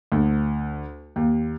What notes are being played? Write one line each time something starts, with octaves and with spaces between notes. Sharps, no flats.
D2
D#2